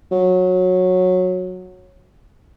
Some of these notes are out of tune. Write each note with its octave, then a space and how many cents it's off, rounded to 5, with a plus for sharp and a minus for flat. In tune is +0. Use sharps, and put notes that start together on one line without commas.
F#3 -15